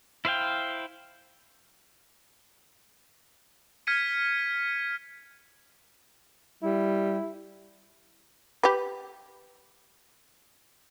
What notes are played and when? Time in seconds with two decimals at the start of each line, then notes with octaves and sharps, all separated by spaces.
0.25 E4 C5 F5 G5
3.87 F6 G#6 B6 C#7 D#7
6.63 G3 E4
8.63 G4 B4